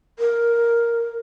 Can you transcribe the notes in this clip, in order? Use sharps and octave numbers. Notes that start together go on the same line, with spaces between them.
A#4